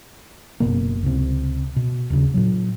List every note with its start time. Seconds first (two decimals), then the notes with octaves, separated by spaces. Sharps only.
0.60 F#1 C#2 B2 A#3
1.03 C#2 C3
1.76 B2
2.10 D#1 C#3
2.34 A#2 F#3